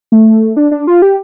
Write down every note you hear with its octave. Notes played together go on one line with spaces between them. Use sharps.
A3
D4
D4
F4
G4